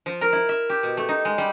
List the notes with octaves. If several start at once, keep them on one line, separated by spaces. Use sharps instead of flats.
F3
A#4
E4
E5
G4
B2
A3
D#4
G#3
G3